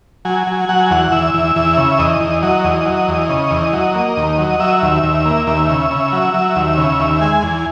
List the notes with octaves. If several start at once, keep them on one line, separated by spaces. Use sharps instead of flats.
F#3 G#5
F#3
F#3 F#5
G#5
E2 F#5
E2 E5
E2
E2
C#3
E2 D#5
E2
F#3 D#5
E2
F#3
E2
C#3
E2
F#3
A#3
D#2
F#3
F#3 E5
D#2
D#2
A#3
D#2 E5
C#3
C#3
F#3
F#3
D#2
C#3
D#2
G#3 G#5
E2